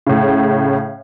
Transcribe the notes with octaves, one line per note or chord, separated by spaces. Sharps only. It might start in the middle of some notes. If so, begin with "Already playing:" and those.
A2 C#3